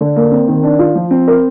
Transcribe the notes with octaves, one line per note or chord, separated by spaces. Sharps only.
D3
A#3
C4
D#3
D4
F4
F3
C4
A#4